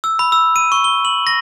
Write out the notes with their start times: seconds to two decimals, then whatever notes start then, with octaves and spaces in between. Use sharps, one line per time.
0.04 E6
0.19 B5
0.32 E6
0.56 D#7
0.72 C#6
0.84 G7
1.05 F#7
1.27 A#6